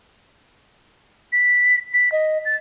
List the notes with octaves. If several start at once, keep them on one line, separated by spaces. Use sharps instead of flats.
B6
B6
D#5
A6